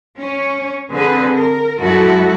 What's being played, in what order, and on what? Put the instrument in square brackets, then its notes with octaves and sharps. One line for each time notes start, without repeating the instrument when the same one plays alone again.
[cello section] C#4 C#5
D3 C4 G#4 B4
A#4
F#2 G#3 E4 F#4 A4